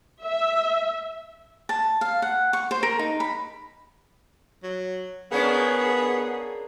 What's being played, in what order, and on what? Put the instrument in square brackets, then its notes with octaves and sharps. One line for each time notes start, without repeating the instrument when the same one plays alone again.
[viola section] E5
[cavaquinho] A5
F5
F#5
C#6
C5
A#4
D#4
B5
[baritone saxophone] F#3
[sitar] A#3 C#4 D4 [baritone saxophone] B3 [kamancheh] G#4